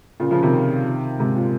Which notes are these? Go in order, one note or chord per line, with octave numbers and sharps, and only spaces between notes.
A#2 C#3
C#3 F3
C3 D#3
G#2 C3
A#2